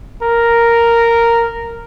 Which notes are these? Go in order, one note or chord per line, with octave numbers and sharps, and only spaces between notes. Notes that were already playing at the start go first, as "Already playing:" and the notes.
A#4